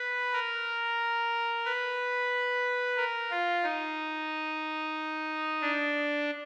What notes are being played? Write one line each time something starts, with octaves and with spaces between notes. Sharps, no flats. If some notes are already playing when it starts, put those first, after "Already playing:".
Already playing: B4
A#4
B4
A#4
F4
D#4
D4